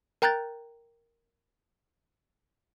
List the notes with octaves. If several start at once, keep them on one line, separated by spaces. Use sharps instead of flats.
A#4 G5 A#5 F#6 G6 A6